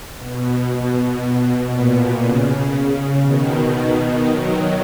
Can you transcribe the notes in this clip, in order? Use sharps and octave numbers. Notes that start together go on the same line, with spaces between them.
B2
A#2
C#3
B2 D#3
D#3 F#3